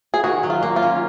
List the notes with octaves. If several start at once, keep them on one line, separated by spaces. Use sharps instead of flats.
G#4
D#3 F#4
F#3
F4
A#3
F4
C#4